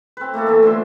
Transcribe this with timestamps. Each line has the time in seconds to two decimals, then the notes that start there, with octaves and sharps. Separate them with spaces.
0.17 C4 B4
0.34 A3 A#3 E4 A4
0.47 E3 A3 A#3
0.63 D3 F3 E5 C6